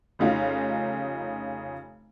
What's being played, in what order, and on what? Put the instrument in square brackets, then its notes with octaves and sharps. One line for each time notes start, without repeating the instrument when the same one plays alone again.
[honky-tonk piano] F1 C#3 D#4 F4 F5